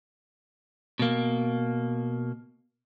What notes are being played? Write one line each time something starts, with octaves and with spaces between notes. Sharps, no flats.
B2 A#3